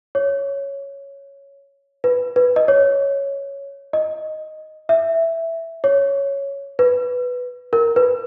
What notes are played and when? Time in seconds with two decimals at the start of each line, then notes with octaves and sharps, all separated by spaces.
0.15 C#5
2.04 B4
2.36 B4
2.56 D#5
2.68 C#5
3.93 D#5
4.89 E5
5.84 C#5
6.79 B4
7.73 A#4
7.96 B4